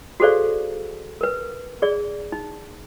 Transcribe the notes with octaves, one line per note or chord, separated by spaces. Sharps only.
F#4 G#4 A4 C5 D5 F5
A#4 B4
G#4 D5
D#4